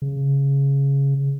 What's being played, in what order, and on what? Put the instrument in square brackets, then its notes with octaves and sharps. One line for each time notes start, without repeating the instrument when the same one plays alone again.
[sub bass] C#3